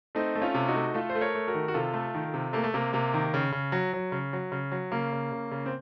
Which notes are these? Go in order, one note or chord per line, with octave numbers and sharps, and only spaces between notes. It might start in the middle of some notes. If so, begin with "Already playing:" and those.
A3 C4 D#4
A3
C#4 F4
C3
D#4 F#4
A3
A3 F4 A4
C5
A3
A#4 C#5
A3
F#4 A#4
D#3
F#4
C3 F4 A4
A3
D#3
C3
A3 A#3
A3
C3 A#3
C3 A#3
D#3
C#3
C#3
F#3
F#3
C#3
F#3
C#3
F#3
C#3 A#3
C#3
C#3
C#3
C4